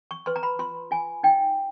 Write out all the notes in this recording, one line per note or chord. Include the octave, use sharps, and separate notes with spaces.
C#6
B4 C6
A#5
B5
F4 C6
F4 G#5
D#4 G5